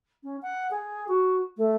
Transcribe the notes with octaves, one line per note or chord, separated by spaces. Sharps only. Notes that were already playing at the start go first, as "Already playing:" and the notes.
C#4
F#5
G#4
F#4
A3